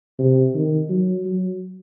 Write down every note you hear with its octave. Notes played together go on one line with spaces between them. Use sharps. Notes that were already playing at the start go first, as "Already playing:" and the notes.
C3
D#3
F#3
F#3